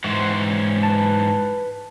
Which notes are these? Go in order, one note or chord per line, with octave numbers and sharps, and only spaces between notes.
G#2 E3 F#4 C5
C#4
B4 A5